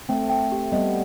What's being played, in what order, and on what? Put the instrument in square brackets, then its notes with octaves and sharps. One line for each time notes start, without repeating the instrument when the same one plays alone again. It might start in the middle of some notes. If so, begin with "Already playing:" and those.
[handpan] A3 C4 [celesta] G5
[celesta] G5
G4
[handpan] G3 B3 [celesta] D#5